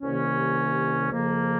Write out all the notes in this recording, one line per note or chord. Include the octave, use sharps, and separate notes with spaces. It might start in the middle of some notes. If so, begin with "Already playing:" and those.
C2 C3 D#3 A#3 C#4
F2 C#3 F3 A#3